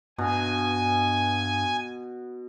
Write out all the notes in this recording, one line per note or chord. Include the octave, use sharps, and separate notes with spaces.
G2 B2 G#5